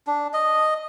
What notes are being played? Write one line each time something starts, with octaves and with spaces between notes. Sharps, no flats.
D4
D#5